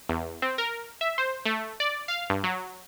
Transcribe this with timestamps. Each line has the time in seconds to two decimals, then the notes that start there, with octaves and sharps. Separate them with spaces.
0.09 E2
0.42 C4
0.58 A#4
1.01 E5
1.18 C5
1.45 A3
1.80 D5
2.08 F5
2.30 G2
2.44 F#3